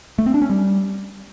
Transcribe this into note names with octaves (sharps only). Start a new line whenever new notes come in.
A3
C4
D4
C#4
G3